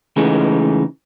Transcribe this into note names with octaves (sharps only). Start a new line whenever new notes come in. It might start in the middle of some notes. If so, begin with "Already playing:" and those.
C#3 E3 G#3 A3 D#4